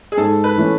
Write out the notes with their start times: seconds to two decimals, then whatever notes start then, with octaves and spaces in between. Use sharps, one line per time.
0.12 G#4
0.18 G#2 A4
0.44 B4
0.57 E3 A3 C#4